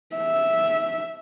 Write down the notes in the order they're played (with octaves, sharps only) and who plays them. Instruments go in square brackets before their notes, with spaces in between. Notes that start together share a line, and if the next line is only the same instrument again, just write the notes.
[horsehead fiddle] E5